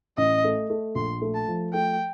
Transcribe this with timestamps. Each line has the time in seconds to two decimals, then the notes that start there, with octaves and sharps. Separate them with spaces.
0.18 A1 D#5
0.44 A3
0.70 A3
0.95 A#1 C6
1.22 A3
1.35 A5
1.48 F3
1.73 A3 G5